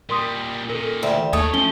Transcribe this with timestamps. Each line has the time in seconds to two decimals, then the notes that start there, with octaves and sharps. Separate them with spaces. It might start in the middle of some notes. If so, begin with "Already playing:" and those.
0.10 A#2 G3 A#4 C6 D#6
0.70 A#2 D#3 A4 A#4
1.02 D2 G3 E5
1.33 D#2 A3 A#3 D#4 C#5 D#6
1.54 F3 C#4 G7